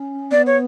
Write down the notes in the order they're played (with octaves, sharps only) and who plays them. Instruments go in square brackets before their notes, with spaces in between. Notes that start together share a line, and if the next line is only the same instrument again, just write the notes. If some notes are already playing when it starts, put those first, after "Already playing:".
Already playing: [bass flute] C#4
[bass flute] B3 [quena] D5
[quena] C#5